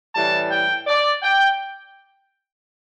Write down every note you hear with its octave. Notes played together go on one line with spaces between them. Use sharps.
A2 E3 G3 A5
G5
D5
G5